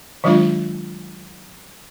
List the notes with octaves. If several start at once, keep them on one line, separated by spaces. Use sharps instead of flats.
D#3 F#3 G#3 D4 F4